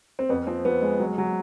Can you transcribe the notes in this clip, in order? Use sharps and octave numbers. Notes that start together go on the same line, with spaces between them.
C4
F2 B3
F3 C4
F3 B3
G#3
F#3
F#3